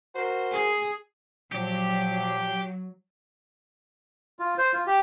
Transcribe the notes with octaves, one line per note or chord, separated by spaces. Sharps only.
F#4 A#4 C5
G#4
A#2 F3 F#3 G4
F4
C5
F4
G4